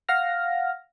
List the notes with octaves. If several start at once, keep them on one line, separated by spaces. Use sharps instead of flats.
F5 F#5 F6 A#6